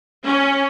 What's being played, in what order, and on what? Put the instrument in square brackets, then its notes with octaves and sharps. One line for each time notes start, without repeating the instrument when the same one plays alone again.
[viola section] C#4